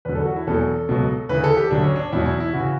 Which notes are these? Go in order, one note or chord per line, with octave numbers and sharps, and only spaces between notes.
E2 D3 F#3 B4
A4
F#4
E4
E2 B2 F#3 A4
C#2 B2 F#3
D2 C#3 E3 B4
A4
G4
D2 D3 F#3 D4
C#4
D4
E2 B2 F#3 E4
E4
E4
C#3 E3 F#4